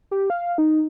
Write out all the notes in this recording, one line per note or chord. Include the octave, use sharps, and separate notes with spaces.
G4
F5
D#4